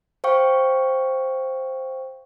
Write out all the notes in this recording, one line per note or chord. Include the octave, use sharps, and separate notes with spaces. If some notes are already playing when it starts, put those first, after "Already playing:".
C5 F5 G5 C#6